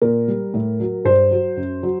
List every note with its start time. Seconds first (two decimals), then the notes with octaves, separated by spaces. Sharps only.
0.02 A#2 A#4
0.28 G3
0.54 A2
0.80 F#3
1.05 G2 C5
1.31 F#3
1.57 F#2
1.83 F#3